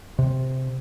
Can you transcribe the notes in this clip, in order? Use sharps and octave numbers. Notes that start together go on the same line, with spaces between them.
C3